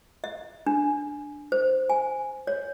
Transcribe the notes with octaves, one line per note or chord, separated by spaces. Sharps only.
E5
D4
C5
G#5
C#5